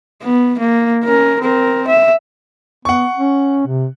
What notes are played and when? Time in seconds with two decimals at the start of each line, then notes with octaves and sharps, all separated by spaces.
0.23 B3
0.59 A#3
1.04 C#4 A#4
1.41 C4 A#4
1.88 E5
2.85 B3 F#5 C#6
3.17 C#4
3.67 C3